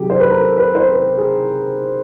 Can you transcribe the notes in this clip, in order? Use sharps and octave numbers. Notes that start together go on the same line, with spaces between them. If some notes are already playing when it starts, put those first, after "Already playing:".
Already playing: C3 D#3 F#3 G4 G#4
C5
B4
A#4
A4
B4
C5
B4
G#4